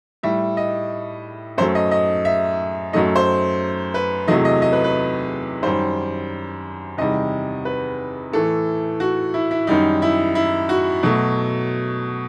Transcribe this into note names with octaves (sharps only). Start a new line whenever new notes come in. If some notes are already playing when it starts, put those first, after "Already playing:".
A2 G3 E5
D#5
F#2 F#3 A3 C5
D#5
D#5
E5
F#2 F#3 A3 D#5
C5
B4
E2 C3 F#3 A3 D#5
D#5
D#5
B4
B4
F#2 D#3 G3 C5
E2 C3 D#3 G3 D#5
B4
A2 E3 A3 A4
F#4
E4
E4
F#2 D#3 G3 D#4
E4
E4
F#4
B2 F#3 A3